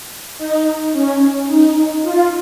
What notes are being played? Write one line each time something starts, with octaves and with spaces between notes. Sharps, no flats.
D#4
C#4
D#4
F4